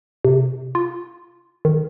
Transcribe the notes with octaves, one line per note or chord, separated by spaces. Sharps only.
C3
F4
D#3